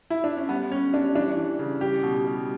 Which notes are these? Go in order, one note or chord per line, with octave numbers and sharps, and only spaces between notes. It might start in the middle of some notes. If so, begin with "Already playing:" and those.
E4
D4
C#4
G3 B3
G3 C#4
G3 D4
E3 D4
E3
C#3
G3 G4
B2
G3